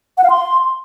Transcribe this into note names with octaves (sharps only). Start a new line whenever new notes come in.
F#5
F5
C6